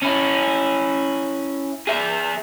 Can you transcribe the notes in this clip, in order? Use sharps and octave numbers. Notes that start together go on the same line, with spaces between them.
C#4 E4
G#4 E5